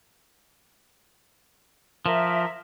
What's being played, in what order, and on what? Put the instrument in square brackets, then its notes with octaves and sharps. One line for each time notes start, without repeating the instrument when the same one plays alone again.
[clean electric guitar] F3 [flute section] A#4 E5